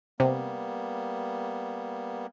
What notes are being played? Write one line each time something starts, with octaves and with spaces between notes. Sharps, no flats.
C3 G3 A#3 B3